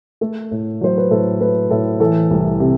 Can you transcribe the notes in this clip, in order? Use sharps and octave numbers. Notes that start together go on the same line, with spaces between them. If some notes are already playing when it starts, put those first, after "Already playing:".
A3 A4
A2
F#3 C5
B4
A2 A4
A3 B4
A2 A4
E3 A4
C2
C3